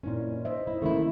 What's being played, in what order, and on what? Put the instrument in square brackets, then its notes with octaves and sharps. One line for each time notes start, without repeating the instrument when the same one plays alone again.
[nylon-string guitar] A#2 C#4 [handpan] C4 D#4 E4
[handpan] C5 D#5 E5
[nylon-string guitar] E4
[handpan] D#3 C#4 [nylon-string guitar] A3 A#3 E4